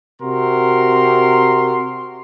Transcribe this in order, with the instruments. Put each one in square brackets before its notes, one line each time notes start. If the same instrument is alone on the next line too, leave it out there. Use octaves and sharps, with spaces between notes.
[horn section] C3 F#4 A#4 C6